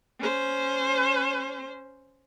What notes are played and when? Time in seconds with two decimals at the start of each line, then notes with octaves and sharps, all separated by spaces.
0.20 C#4 C5